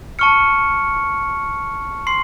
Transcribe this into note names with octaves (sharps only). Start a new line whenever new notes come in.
A5 C#6 F6 C#7
C6 C7